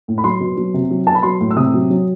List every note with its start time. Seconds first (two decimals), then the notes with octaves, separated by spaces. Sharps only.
0.08 A2
0.18 B5
0.24 F#3 C6
0.40 B2
0.57 F#3
0.74 C3
0.90 F#3
1.07 B2 A5
1.15 B5
1.23 F#3 C6
1.40 A2
1.51 E6
1.56 C3 D#6
1.74 F#3
1.90 F#3